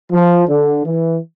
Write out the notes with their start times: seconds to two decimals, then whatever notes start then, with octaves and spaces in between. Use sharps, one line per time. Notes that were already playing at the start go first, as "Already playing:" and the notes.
0.11 F3
0.48 D3
0.84 E3